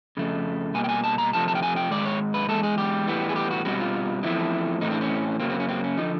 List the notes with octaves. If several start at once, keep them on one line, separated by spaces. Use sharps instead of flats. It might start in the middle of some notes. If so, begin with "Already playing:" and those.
F2 C#3 A3
B2 G3 A#3 G#5
G5
G#5
A5
A#5
F2 C3 F3 A3 A5
A5
G5
G#5
G5
G#2 D#3 G#3 D5
C#5
B4
E2 B2 G#3 A4
G#4
G4
A2 E3 G3 B3
G#4
G4
F#4
B2 G3 C4 F#4
F4
E2 C#3 F3 A3 C4 E4
A2 E3 A3 C4 D#4
D4
C#4
F#2 C#3 F#3 A#3 C4
C4
C#4
C4
C#4
D3 F3 D#4